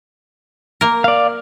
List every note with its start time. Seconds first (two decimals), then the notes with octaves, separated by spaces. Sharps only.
0.81 A#3 A#4
1.04 D5 F5